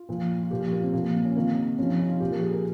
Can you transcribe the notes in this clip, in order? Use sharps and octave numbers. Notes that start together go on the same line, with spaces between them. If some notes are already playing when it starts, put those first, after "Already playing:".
Already playing: F4
A#2 F3
F4
A#2 F3 G4
F4
A#3
C4
A#2 F3 A#3
A#3
C#4
C3 D#3 A#3
C3 F3 C#4
D#4
F4
F4
A#2 F3 G4
A#4
G#4
A#4